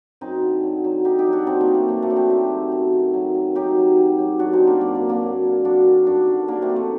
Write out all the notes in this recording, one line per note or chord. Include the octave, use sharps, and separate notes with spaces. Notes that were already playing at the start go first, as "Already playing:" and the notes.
F#2 C4 D#4
D3
F#3
F#3
F#3 D#4 G4
D#4 G4
F#3
D4 F#4
F#2 C4 D#4
A#3 D4
D#3
A3
F#3 A#3
A3 C4
F#3 D4
C4 D#4
F#3 D#4 G4
F#3
F#2
D#3
F#3
F#3
F#3 D#4 G4
F#3
F#3
F#3
F#2 D4 F#4
C4 D#4
D#3
A#3 D4
F#2 A#3
A#3
D3
A#3 D4
F#3
F#3
F#2 D4 F#4
D#3
G2 D4 F#4
D3
F#2 A#3 D4
A3 C4
D#3
A3